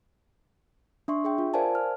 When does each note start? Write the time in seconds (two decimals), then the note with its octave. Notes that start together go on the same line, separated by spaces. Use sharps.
1.08 D4 E5 C6 C#6
1.24 G#4 E5 G5
1.38 F4
1.54 A#4 C5 D5 F5 G#5 A5
1.75 F6